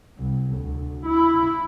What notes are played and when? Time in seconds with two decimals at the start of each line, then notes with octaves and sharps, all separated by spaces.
0.18 C2
0.56 D2
1.06 E4